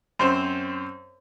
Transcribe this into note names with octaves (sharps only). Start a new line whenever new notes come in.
F#2 C4 C5